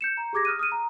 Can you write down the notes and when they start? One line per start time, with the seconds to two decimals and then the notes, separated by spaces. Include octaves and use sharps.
0.01 G6 C#7 E7
0.17 A#5
0.33 G4 G#4 D6 G#6 A#6
0.45 D#6 F6 F#6 D#7
0.59 D#6 F6 D#7
0.72 A#5